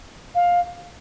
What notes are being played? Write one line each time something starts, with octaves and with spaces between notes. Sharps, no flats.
F5